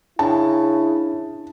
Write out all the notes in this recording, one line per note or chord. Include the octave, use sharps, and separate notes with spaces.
C#3 D4 E4 A5